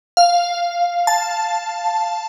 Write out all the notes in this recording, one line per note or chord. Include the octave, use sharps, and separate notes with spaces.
F5
A5